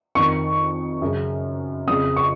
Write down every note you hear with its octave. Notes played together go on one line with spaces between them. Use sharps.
F2 D#3 C#6
F#2 C#3
F2 C#3 D#6
C#6